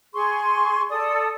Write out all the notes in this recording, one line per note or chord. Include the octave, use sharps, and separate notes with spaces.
G#4 C6 C#6
A4 D5 D#6